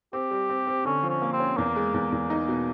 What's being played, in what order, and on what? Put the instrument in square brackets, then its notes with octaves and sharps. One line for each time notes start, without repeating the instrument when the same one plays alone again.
[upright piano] C4 [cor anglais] G4
[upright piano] G3
C4
C4
[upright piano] D3 [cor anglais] C#4
[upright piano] F3
[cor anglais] C#4
[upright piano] A#3
[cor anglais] C4
[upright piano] C#4
[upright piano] E2 [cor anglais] A#3
[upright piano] G#3
E2
E2
D#4
B2